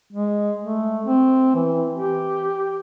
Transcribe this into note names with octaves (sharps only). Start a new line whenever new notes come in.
G#3
A3
C4
E3
G4